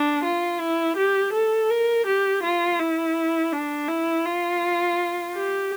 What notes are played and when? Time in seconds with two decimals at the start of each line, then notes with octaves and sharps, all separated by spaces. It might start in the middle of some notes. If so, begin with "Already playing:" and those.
Already playing: D4
0.24 F4
0.60 E4
0.96 G4
1.33 A4
1.70 A#4
2.06 G4
2.43 F4
2.79 E4
3.52 D4
3.88 E4
4.25 F4
5.34 G4